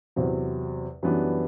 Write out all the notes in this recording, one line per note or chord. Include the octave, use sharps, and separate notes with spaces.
E2 C3 F#3 C4
F#2 E3 G3 B3 D4